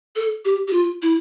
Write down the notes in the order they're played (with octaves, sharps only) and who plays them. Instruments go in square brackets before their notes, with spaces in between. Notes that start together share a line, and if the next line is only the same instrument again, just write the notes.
[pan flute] A4
G4
G4
F4
E4